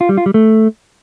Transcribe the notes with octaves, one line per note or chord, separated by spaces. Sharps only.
F4
G3
F4
G3
A3